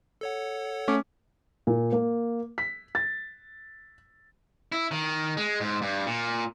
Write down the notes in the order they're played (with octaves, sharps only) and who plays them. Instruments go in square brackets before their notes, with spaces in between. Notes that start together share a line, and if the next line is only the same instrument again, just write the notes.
[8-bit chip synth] A4 C#5 F#5
[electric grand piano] A3 C#4 D6
[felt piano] A#2
A#3
B6
A6
[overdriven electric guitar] E4
D#3
G#3
G#2
G2
A#2